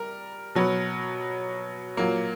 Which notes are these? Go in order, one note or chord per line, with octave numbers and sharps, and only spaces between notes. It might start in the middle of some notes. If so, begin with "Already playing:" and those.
Already playing: G3 A#4
B2 F#3 B3
A#2 F#3 A#3